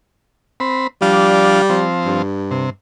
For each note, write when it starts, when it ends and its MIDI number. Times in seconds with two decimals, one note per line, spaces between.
0.60 0.87 60
0.60 0.87 83
1.02 1.62 53
1.02 1.87 55
1.02 1.62 62
1.02 1.62 77
1.70 2.22 53
1.70 2.22 60
2.06 2.69 43
2.51 2.70 48